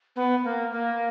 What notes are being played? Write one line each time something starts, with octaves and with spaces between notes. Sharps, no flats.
B3
A#3
A#3